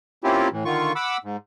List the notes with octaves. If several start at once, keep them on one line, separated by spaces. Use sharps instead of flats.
A#3 C4 C#4 E4 F4 G4
A2 E3
D3 D#3 F4 C#6
F#5 B5 D6 E6
G#2